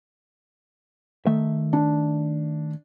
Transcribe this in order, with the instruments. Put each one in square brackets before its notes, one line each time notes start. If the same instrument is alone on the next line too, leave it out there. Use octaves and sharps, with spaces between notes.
[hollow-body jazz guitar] D#3 A3 E5
[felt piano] D4